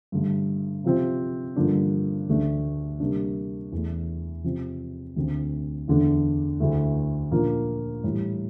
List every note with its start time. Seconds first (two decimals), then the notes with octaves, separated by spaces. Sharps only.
0.12 G2 D3 A3
0.84 C3 F3 C4
1.56 G2 D3 F3 A#3 D4
2.29 D2 D3 A3 D4
3.00 C3 G3 A#3 D4
3.72 E2 E3 A3
4.44 C3 F3 C4
5.16 D2 D3 A3 C4
5.88 E2 D3 A3 D4
6.60 D2 D3 A3 E4
7.32 A#2 F3 A#3 D4
8.04 A2 E3 G3